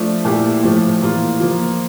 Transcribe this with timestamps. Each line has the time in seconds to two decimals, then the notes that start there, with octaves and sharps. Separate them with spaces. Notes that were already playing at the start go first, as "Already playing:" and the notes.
Already playing: F3 A3 D4
0.25 A#2 A3 E4 G4
0.63 A2 F3 A3
1.02 E3 A#3 F4
1.40 F3 A#3 F4